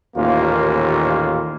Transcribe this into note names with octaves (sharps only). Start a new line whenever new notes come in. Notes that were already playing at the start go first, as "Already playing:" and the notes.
A1 D#2 A#2 A#3 F4